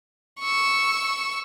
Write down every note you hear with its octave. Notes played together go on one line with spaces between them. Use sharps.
C#6 E6